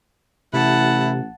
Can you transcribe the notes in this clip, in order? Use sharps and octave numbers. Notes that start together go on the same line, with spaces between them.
A1 C3 E4 F#5 A5